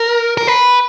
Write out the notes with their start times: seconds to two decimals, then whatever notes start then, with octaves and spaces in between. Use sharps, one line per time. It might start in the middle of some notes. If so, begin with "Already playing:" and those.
Already playing: A#4
0.37 A#4
0.47 B4